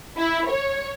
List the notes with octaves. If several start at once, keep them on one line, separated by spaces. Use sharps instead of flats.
E4
C#5